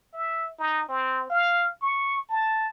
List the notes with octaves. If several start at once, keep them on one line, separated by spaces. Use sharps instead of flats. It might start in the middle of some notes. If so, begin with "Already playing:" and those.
E5
D#4
C4
F5
C#6
A5